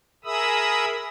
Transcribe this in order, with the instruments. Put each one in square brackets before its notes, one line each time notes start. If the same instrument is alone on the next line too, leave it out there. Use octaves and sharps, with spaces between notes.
[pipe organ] G#4 A#4 E5 B5 D#6 E6